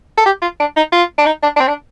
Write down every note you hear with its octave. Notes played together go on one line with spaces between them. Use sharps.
A4
G4
F4
D4
D#4
F4
D4
D#4
D4
D4
C4
D4